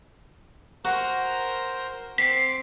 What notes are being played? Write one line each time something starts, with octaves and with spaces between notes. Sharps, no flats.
F#4 A#4 C5 A#5
C4 D6 B6 C7